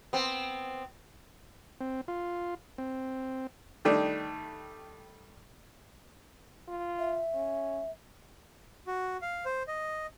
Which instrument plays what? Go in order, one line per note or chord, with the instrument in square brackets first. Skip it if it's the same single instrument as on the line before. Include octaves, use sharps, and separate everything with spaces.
[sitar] B3 C4
[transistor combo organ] C4
F4
C4
[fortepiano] D#3 G3 A3 D4
[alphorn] F4
[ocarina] E5
[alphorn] C#4
[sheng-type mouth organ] F#4
F5
C5
D#5